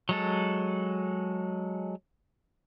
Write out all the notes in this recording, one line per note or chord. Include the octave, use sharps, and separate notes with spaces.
F#3 G#3 A4